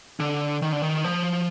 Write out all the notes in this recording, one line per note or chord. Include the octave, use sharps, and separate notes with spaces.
D3
D#3
D3
D#3
F3